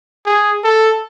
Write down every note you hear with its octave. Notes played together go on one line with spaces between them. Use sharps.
G#4
A4